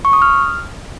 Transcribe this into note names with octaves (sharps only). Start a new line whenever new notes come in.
C#6
D#6
F6